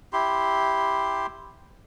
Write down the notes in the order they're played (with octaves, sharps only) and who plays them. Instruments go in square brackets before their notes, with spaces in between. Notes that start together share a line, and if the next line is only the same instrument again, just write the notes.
[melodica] E4 G4 C6